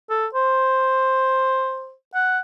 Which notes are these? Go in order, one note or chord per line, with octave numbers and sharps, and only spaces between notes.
A4
C5
F#5